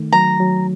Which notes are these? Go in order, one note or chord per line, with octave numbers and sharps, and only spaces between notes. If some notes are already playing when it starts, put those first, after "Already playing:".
Already playing: D#3 A3
F#3 A#5
F#3